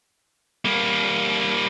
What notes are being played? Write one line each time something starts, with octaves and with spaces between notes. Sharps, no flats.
G3 A#3